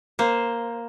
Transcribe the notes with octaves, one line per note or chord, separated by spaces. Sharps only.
A#3 C5